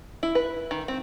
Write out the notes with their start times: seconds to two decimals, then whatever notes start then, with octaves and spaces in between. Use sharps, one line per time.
0.23 E4
0.35 B4
0.71 D#3
0.88 C4